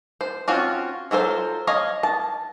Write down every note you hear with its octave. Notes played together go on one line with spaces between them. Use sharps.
C5
C4 C#4 F4 F#4
F#3 F4 A4 C5
C#5 D#5 F5
A5